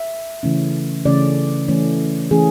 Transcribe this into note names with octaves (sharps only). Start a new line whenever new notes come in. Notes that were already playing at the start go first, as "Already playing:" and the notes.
Already playing: E5
C#3 E3 A3 C#4
C#3 E3 A3 C#4 D5
E3 A3 C#4
E3 A3 C#4 G#4